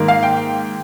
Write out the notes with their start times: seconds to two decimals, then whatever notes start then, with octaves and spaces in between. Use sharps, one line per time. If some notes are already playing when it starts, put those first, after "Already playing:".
Already playing: G#2 D#3 A#3
0.08 F5
0.23 G5